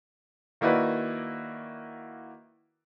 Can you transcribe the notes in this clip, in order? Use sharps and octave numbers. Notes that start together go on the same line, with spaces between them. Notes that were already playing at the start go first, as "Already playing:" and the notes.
D#3 A#3 E4 F#4 B4 D5